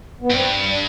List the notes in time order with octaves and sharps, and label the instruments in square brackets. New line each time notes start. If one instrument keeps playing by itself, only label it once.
[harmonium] B3
[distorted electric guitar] G2 [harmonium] C4
[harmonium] D4